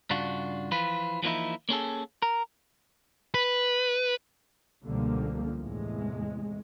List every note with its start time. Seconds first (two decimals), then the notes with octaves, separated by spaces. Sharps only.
0.10 G2 C#3 D4 F4 F#4
0.71 E3 F3 F4 B4
1.22 E3 F3 A#3 D#4 E4
1.69 A#3 C#4 G#4 A4
2.22 A#4
3.34 B4
4.83 C#2 B2 D3 F3 G3 A#3
5.59 E2 A2 C3 G#3